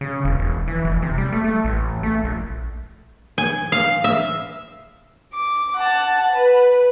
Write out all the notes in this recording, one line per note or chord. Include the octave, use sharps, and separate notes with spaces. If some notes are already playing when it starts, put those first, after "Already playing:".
C#3
E1
E1
E3
F1
C3
G3
A3
A3
A1
A3
A#1
G#5
F5
E5
D6
F#5 A5
B4